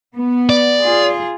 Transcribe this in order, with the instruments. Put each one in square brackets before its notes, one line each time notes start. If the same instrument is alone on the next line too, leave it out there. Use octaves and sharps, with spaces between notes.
[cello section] B3
[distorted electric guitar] D5
[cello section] F4 G#4